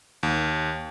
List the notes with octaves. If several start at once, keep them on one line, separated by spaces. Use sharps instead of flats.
D#2